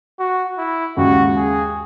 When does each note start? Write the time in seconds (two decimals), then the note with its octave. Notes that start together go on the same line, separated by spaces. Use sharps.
0.19 F#4
0.58 E4
0.97 D#2 C#3 G#3 F#4
1.36 G#4